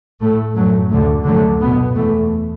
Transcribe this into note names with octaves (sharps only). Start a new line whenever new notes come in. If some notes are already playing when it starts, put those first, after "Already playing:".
A2 A3
F#2 F#3 A3
D2 D3 A3
F#2 D3 F#3 A3
B2 B3
E2 E3 A3